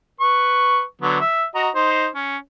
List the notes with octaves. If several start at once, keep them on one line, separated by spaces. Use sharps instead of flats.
B4 C#6
D3 F#3 B3
E5
F#4 D#5 A#5
D#4 C5
C#4